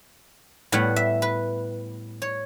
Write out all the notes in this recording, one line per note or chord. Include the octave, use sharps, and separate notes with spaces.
A2 G3 B3 F#5
E5
B4
C#5